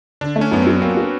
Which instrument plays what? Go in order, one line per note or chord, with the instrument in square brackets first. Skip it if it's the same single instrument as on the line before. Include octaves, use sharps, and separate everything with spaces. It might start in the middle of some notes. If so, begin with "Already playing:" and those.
[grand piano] D3 [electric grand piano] D4
[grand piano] A3
[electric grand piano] C#4
[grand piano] F#2 [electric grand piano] B3
[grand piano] F#3 [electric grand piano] C4
[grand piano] A#3 [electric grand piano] C4
[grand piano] F#4